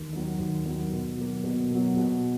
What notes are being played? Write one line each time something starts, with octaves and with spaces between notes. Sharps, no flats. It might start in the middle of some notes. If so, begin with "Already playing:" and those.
Already playing: D#2
D#3 F#3
D#2
D#3 F#3
B2
F#3 A#3
B2
F#3 A#3
B2